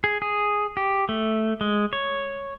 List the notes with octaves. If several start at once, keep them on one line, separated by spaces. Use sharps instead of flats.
G#4
G#4
G4
A3
G#3
C#5